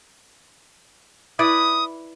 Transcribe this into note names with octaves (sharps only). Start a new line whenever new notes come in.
E4 B4 D5 D#6